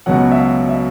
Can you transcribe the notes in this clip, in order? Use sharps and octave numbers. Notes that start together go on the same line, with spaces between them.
C#2 B2 F#3 F#5
E5
F5
E5